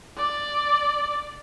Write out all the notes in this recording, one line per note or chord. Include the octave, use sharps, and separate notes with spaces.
D5